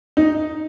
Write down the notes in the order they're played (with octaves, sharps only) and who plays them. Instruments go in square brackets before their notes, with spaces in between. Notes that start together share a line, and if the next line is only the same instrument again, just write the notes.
[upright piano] D#4